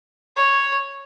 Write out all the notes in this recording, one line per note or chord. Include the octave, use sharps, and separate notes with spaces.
C#5